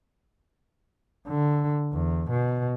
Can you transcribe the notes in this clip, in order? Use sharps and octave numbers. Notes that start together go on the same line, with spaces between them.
D3
E2
B2